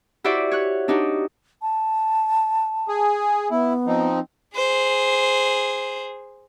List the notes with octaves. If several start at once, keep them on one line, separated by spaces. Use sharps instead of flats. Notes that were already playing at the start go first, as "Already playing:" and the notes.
E4 F#4 G4 C5 D5 E5
C#5 F#6
D4 D#4 F#4 G4
A5
G#4
B3 E4
F3 C4 D#4
G#4 C5